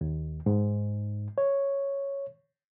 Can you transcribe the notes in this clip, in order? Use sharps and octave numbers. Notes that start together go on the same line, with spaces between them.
D#2
G#2
C#5